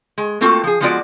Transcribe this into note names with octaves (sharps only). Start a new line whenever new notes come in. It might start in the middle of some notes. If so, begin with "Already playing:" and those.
G#3
A3 A#3 C4 F4 F#4 A4
F3 G#4
F3 G#3 B3 F4 F#4 D5